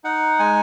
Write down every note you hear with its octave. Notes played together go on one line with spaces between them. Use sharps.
D#4 F#5
G#3 G#5